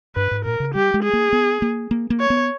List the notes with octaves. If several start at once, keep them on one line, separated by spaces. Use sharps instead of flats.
G2 B4
G#2
A#2 A#4
C#3
G3 G4
G#3
G#4
A#3
B3
A#3
A#3
A#3
C#5
B3